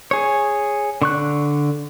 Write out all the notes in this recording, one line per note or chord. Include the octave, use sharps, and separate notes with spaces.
G#4 C#5
D3 C#6 F#6